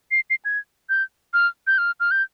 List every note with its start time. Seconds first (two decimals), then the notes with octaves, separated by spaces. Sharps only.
0.11 C7
0.30 C7
0.45 G#6
0.89 G6
1.34 F6
1.67 G6
1.78 F6
2.00 F6
2.11 G6